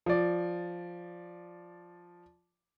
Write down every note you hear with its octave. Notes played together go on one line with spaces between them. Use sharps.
F3 D5